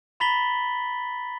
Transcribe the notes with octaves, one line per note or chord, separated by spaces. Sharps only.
A#5 B5 A6 B6 F#7 G7